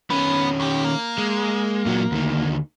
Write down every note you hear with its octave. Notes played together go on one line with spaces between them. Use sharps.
D#3 B3 C#4
D#2 G4
A#3
G#3
A#2 F#3
D2 D#3